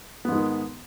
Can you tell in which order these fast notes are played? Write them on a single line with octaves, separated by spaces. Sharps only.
B3 G#2 G#3 D#3